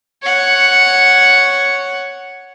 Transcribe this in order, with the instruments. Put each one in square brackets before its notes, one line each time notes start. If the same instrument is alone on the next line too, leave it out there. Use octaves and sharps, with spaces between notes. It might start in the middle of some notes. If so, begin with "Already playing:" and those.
[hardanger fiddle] C#5 F#5